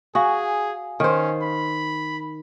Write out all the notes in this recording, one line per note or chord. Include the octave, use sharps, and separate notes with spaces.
F#4 G#4 F5 G#5 D#6
D#3 C#4 C5
B5